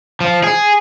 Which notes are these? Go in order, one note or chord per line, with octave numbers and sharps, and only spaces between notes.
F3
G#4